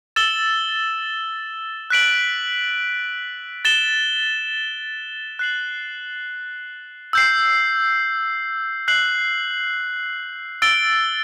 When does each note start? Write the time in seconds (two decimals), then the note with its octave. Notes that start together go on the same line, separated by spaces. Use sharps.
0.16 E6 A6 E7 G7
1.90 F#6 B6 D7 F#7
3.65 A6 E7 G7
5.39 F#6 C7 F#7
7.13 E6 G6 C7
8.88 F#6 C7 F#7
10.62 E6 A6 D7 G7